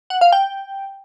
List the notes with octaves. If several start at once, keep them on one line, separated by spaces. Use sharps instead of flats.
F#5
F5
G5